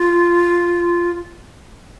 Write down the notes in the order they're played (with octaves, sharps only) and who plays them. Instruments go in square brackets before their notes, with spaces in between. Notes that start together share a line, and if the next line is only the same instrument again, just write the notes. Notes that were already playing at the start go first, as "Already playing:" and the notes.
Already playing: [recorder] F4